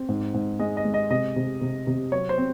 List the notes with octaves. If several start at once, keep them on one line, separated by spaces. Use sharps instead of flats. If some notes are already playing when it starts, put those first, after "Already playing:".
Already playing: C4
G#2
G#2
G#3 D#5
D#5
G#3
D#5
C3 D#5
C3
C3
C3
F#3 C#5
C5
C4